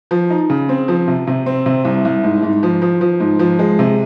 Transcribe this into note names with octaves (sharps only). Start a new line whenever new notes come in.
F3
D#4
C#3
C4
F3
C3
C3
C4
C3
C2
C2
G#2
G#2
F3
F3
F3
G#2
F3
G#3
C3